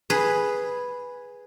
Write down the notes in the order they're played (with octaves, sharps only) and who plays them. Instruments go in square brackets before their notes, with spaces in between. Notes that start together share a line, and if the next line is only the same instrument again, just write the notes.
[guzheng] G#4 B4